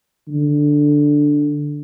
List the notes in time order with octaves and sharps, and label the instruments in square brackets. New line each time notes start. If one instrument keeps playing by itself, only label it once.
[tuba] D3